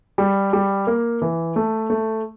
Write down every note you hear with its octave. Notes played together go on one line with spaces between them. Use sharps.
G3
G3
A#3
E3
A3
A3